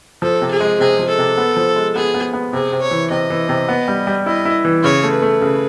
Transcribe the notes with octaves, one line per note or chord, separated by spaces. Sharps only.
F3 A4
C3
G#4
G#3
C3 G#4
F3
A4
C3
B3
F3
G#3
B3 G#4
B3
B3
C3 G#4
C3
C#5
E3
C3 D#5
E3
C3
B3
G3
G3
E4 D#5
E4
E3
C#3 C#5
A3
B4
A3
C#3